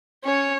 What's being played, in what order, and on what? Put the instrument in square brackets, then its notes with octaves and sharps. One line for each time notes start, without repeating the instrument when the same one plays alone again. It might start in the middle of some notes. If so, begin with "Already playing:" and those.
[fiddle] C#4 [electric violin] C#5